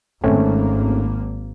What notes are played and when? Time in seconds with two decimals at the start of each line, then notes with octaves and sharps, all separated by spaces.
0.24 G#1 A3 A#3 C4 C#4